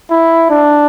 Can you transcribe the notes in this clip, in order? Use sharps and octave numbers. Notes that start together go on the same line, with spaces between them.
E4
D4